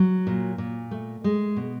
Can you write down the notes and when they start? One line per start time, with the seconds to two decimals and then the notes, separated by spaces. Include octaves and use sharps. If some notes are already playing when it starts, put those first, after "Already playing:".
Already playing: F#3
0.27 A#2
0.58 A#2
0.91 A3
1.24 G#3
1.56 B2